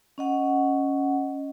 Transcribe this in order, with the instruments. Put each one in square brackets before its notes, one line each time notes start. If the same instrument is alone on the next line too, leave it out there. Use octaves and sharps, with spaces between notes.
[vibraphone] C#4 D#5 F#5